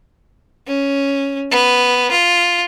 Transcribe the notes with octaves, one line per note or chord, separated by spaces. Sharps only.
C#4
B3
F4